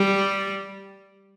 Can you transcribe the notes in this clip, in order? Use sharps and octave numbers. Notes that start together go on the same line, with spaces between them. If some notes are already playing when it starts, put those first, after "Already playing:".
Already playing: G3